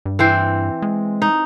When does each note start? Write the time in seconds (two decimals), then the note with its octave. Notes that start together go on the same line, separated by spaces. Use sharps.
0.06 G2
0.19 E3 C4 C5
0.82 G#3
1.22 D#4